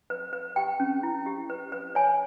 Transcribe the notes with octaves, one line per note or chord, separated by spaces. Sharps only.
B4
B4
G4 G5
C#4
E4
G4
B4
B4
C#5 G#5